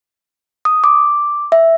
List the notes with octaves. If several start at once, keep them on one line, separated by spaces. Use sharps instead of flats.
D#6
D6
E5